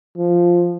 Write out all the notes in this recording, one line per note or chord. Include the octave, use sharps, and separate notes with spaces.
F3